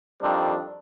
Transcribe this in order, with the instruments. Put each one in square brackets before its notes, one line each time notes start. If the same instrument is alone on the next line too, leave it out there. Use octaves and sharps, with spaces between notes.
[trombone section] F2 D#3 G3 C4 D4